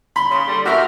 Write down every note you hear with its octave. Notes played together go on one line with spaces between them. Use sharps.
B5 C6
C#3 C6
D3 G3
E2 F#4 G4 A#4 E5 C#6 F6